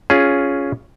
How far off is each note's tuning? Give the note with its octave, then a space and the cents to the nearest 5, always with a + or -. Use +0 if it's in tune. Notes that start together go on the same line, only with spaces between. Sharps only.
C#4 +5 F4 +0 G#4 +0